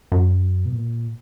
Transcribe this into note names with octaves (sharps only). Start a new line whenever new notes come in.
F#2
B2
A#2